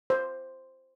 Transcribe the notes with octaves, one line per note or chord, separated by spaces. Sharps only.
C5